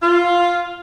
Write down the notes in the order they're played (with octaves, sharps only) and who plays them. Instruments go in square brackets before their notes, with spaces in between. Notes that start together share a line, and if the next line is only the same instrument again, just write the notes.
[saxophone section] F4